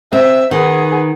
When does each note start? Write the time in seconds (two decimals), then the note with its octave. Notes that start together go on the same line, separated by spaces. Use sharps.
0.13 C4 E5
0.51 D#3 B3 G#4